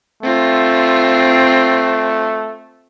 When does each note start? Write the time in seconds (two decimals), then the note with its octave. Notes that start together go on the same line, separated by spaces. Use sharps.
0.23 A3 C4 F4